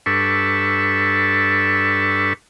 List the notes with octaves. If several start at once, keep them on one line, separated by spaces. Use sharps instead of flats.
G2 D4 A4 B4 C#6 E6